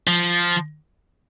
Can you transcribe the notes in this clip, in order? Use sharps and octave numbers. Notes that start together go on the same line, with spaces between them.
F3